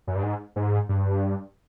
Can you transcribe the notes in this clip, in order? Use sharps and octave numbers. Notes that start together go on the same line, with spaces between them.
F#2
G2
G#2
G#2
G2